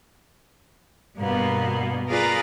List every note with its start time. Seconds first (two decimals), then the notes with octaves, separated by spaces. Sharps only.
1.17 G2 B2 A#3 B3
2.08 F4 G#4 A#4 B4 D5 A#5